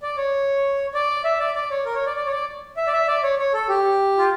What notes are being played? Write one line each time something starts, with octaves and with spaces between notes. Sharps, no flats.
D5
C#5
D5
E5
D5
D5
C#5
A#4
C#5
D5
D5
C#5
D5
E5
D5
E5
D5
C#5
C#5
A4
G4
F4